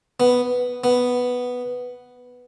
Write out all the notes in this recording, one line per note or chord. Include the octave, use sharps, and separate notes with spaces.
B3
B3